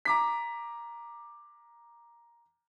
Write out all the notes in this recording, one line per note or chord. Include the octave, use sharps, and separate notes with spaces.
A#5 D6 B6